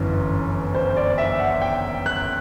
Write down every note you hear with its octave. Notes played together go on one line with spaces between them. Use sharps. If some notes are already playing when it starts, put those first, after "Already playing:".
Already playing: G1 F#2 E3
C5
D5
E5
F#5
G5
F#6